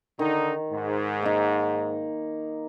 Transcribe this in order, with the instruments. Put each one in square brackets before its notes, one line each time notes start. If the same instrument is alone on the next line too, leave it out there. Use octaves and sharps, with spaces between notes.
[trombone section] D3 D#4 [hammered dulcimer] D#3
[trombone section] G#2
[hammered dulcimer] A#3 D#4